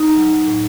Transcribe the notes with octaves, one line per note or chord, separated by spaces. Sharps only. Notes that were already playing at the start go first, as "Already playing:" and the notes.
Already playing: D#4
F#3
A2